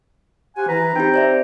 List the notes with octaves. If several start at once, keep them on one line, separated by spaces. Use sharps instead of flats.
G4 C5 F5 F#5 G#5
E3 B4 A#5
C4 D#4 G4 G5
C5 D5 E5